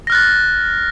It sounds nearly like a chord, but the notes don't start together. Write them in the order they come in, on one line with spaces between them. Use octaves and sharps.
A#6 F6 F#6 A6